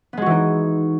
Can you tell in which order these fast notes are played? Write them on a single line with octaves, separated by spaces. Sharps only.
B3 G#3 F#4 E3 D#4